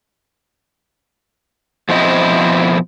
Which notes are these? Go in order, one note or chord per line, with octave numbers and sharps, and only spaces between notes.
F2 B2 F3 C4 E4 D#5